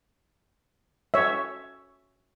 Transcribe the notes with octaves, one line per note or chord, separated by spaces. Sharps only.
C#5 E5